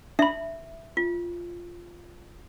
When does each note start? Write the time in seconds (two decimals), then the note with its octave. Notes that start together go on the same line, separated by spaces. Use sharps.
0.19 D4 E5 B5
0.97 F4